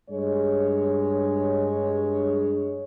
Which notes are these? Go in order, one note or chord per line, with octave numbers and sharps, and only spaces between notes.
G2 G#3 C#5